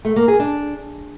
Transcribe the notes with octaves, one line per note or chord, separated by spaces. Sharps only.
A3
A#3
G#4
D4